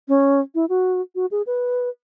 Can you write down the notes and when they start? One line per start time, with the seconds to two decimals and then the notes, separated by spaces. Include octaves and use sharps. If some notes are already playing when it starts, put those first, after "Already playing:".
0.08 C#4
0.55 E4
0.69 F#4
1.15 F#4
1.31 G#4
1.47 B4